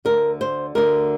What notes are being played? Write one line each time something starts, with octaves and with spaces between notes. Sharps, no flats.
D2 D3 A#4
C5
D2 D3 A#4